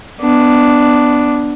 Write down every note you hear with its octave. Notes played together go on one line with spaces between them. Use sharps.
B3 D4